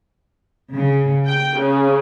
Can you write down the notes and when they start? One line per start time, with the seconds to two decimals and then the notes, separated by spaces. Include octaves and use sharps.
0.74 C#3
1.26 G5
1.58 C#3